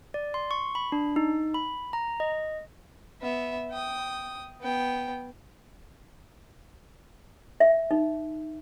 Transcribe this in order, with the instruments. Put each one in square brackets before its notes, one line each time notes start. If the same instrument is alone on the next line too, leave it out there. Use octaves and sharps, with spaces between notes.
[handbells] D5
C6
C#6
B5
D4
D#4
B5
A#5
D#5
[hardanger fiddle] B3 E5
G5 D#6
B3 G5
[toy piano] E5
D#4